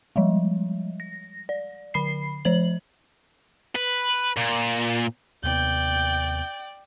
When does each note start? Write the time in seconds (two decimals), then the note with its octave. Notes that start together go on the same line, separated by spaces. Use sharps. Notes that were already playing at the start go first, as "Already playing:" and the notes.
0.16 F3 G3 G#3
1.00 A#6
1.49 D5
1.94 D3 B5 C7
2.45 F3 C5 F#7
3.75 B4
4.37 A#2
5.44 D#2 C3 B3 D5 G5 G6